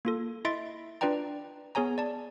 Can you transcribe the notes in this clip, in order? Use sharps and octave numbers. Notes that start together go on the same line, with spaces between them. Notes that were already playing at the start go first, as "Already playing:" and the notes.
A#3 F4 A4
E4 D#5 E5 C6 A6 D7
D4 F4 B4 D5 G5 A#5
B3 G#4 C#5 G#5 A#5
D5 A5